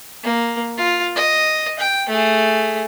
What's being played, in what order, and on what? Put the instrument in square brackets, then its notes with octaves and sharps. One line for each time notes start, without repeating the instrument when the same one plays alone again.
[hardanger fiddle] A#3
F4
D#5
G5
A3 G#4